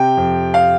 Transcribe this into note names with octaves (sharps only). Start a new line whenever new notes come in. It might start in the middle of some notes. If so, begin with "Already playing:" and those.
Already playing: C3 G5
F2
F5